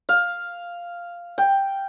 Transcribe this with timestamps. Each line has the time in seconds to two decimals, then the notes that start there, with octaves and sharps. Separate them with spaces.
0.09 F5
1.38 G5